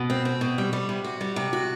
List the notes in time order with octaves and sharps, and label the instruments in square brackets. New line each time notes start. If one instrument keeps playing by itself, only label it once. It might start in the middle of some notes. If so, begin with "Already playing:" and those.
Already playing: [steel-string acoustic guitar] B2
C4
C4
B2
G3
G3
C3
F#4
G3
C3
F#4